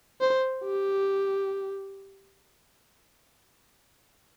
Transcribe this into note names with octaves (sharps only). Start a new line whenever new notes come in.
C5
G4